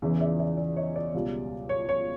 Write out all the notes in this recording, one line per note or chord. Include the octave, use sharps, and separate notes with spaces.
E2 C#3 E3
D5 E5
D5 E5
D5
C#5 D#5
D5
C#2 B2 G3
C#5
C#5